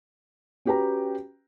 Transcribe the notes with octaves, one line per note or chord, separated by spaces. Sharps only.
C#4 F#4 G4 B4 G5 A#5